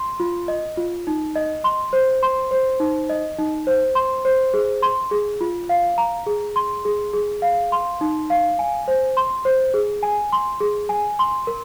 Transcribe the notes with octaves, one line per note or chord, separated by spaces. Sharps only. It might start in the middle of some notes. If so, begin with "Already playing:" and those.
Already playing: C6
F4
D#5
F4
D#4
D#5
C6
C5
C6
C5
D#4
D#5
D#4
C5
C6
C5
G#4
C6
G#4
F4
F5
A#5
G#4
C6
G#4
G#4
F5
C6
D#4
F5
G#5
C5
C6
C5
G#4
G#5
C6
G#4
G#5
C6
A#4